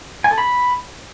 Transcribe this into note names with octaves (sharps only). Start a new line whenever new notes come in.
G#5
A4
B5